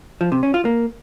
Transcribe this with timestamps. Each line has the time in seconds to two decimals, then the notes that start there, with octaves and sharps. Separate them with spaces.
0.21 F3
0.32 C3
0.43 C#4
0.54 F4
0.65 A#3